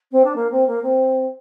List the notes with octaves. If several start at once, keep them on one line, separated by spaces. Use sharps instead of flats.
C4
D4
A#3
C4
A#3
C4